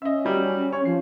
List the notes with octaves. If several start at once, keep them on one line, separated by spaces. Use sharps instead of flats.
C#4 D#5 E5
F#3 G3 G4
C#5
F3 C7